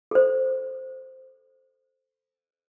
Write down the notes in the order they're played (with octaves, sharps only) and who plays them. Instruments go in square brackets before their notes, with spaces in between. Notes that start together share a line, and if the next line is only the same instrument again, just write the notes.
[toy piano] A4 C5